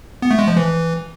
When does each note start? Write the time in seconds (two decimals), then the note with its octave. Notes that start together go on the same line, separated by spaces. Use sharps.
0.22 B3
0.31 A3
0.39 G#3
0.48 F3
0.57 E3